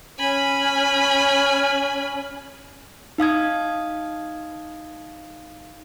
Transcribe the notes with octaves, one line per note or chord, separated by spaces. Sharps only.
C#4 G#5 B5
D#4 F5 D#6 G#6